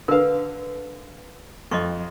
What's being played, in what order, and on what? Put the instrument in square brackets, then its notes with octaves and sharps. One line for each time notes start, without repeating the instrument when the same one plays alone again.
[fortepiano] D3 F5 [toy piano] A#4 B4
[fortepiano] F2 [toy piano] D#5 C6 C#6